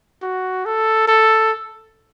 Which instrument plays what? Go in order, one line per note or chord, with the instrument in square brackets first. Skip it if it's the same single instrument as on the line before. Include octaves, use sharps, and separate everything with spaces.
[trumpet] F#4
A4
A4